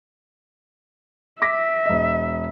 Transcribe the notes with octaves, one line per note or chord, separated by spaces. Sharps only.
E5 D6 A#6 B6
E1 D#5